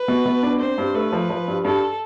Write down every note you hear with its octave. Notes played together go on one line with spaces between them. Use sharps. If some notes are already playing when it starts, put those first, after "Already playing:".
Already playing: B4
B2
B2
D4
C4 C5
G2
A3 B4
F3
F3
G2
G2 A4